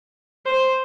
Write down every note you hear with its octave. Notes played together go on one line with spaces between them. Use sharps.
C5